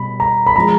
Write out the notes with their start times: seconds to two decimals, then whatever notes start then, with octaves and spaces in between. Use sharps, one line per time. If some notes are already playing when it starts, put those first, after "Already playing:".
Already playing: B2 G3 B5
0.20 A#5
0.46 B5
0.56 F3 G#3 A#5